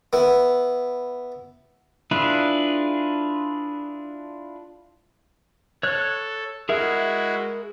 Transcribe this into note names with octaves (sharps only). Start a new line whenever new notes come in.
B3 E4
D4 E4 F4 G#4 B4
A4 C#5 F#6
G#3 E4 F#4 G#4 A#4 E5